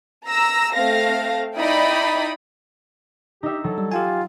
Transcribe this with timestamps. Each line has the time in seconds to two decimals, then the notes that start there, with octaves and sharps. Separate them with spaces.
0.27 A#5 E6 A#6
0.74 A3 C4 F5 A#6
1.57 D#4 E4 D5 G5 B5 D#6
3.43 D#4 G4 E5
3.64 F#3 A4
3.78 G3
3.92 F4 G4 G5 G#5